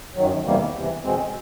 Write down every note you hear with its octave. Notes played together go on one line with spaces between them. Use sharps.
F#2 D#3 F#3
E2 C3 D#3 G3 A#3
E2 C3 E3
E2 B2 G#3 C4